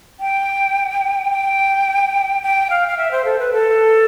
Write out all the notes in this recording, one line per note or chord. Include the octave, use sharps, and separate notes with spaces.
G5
G5
G5
F5
F5
E5
C5
A4
B4
A4